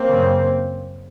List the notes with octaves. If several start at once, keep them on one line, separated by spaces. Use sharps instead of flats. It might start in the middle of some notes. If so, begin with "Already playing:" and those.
Already playing: A#3 C4
F#2 C#3